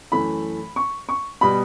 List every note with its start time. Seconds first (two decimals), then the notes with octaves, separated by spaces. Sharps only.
0.12 F#2 E3 A3 B5
0.76 C#6
1.09 C#6
1.41 B2 G3 B3 B5